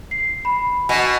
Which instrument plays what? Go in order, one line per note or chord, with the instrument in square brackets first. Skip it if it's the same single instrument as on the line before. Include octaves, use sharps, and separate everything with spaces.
[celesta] C7
B5
[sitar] B2 [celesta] G#5